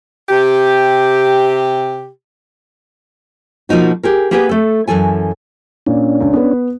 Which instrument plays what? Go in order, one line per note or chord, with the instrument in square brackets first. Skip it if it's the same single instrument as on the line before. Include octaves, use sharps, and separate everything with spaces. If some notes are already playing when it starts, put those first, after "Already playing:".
[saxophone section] C3 G4
[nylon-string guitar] B2 F3 A#3 D#4 F#4
G4 G#4 A#4
A#3 B3 G4 G#4 B4
A3 A4
F#2 C#3 E3 A4 G#5
[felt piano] A#2 [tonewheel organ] C#4 D4
[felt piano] C#2
B3 B4